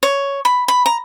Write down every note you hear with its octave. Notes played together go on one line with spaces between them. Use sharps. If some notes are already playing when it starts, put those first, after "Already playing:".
C#5
B5
B5
A#5